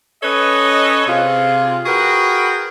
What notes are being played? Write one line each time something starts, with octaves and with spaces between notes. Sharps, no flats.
C#4 A4 B4 C#5 D#5
C3 F4 G#4
F#4 G#4 A#4 B4 F#5 G5